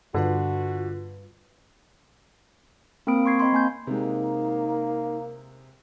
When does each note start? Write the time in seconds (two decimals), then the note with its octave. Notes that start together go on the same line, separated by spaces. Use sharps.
0.14 G2 D3 F4 F#4 B4
3.07 A#3 C4 A#4 B5 D#6 D7
3.25 C6 C#6 G#6 C7
3.39 C4 D#5 B5 C6
3.53 A#3 G#5 G6
3.87 C3 G#3 A#3 D#4